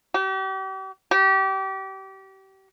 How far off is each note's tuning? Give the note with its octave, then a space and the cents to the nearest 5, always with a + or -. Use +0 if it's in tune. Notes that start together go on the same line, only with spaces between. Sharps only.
G4 -40
G4 -30